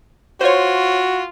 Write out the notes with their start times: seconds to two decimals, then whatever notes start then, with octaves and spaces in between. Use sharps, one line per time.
0.41 F4 F#4 C5 C#5